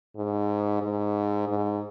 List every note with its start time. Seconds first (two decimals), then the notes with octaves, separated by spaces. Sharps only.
0.17 G#2
0.82 G#2
1.48 G#2